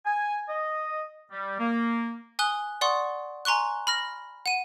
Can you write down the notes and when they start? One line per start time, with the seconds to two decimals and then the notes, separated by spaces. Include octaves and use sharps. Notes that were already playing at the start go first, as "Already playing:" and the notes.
0.06 G#5
0.49 D#5
1.32 G3
1.59 A#3
2.39 G#5 D#6 F#6 G7
2.81 D5 F#5 C6 C#6 D#6
3.45 G#5 A#5 C6 C#6 F#6
3.87 B5 F6 A#6
4.46 F#5 D#7